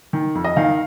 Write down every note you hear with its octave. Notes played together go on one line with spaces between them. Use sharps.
D#3
F2
D#5
D#3 F5